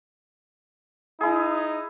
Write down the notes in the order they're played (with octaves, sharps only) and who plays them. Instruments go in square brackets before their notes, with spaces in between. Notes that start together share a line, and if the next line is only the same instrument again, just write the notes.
[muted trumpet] D#4 [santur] E4 G#4